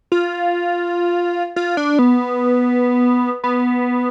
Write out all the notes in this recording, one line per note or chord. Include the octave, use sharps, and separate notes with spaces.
F4
F4
D4
B3
B3